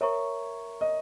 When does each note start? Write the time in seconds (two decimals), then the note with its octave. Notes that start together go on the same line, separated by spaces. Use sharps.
0.01 A#4 C#5 E5 A#5 C#6
0.81 D#5